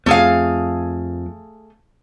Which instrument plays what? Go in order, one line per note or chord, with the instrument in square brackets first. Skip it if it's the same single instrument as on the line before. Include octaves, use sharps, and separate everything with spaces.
[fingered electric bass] F2 [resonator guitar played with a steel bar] A3 G#4 F5